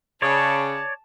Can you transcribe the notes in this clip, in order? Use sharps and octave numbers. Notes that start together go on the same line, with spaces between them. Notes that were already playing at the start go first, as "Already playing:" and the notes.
C#3 C#5 D5 A5